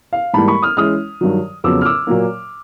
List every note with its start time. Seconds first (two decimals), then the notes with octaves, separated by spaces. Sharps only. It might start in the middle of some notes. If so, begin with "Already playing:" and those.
0.13 F5
0.34 G#2 E3 G3 A#3 A5 B5
0.48 B5 C#6
0.62 D#6 F6
0.77 E3 G#3 C#4 E4 D#6 F6
1.21 G2 D#3 F#3
1.64 F2 C#3 F#3 B3 D6 E6
1.81 F6
1.85 D6 E6
2.07 A#2 F#3 A#3